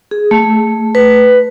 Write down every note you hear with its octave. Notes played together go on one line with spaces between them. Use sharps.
G#4
A3
B4